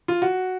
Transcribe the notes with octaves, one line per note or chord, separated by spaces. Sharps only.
F4
F#4